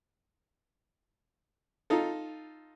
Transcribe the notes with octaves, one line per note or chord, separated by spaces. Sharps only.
D#4 F4 A4